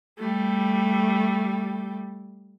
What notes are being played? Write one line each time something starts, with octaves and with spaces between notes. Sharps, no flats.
G3 A3